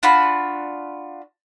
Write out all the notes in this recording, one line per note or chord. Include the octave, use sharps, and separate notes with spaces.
D4 F4 F#4 B5